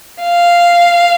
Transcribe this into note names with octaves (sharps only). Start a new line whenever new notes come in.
F5